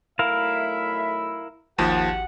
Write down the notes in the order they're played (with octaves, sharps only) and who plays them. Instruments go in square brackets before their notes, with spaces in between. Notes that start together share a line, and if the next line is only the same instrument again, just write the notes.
[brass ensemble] B1 A3 E5 [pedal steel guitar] E4 A#4 F5
[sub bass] G#1 [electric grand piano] D#2 F3 A5 [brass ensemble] F#4 G4 F#5